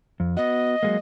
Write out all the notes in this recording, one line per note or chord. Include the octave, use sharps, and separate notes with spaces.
F2
B3 F#4 D#5
F#3 G#3 A#3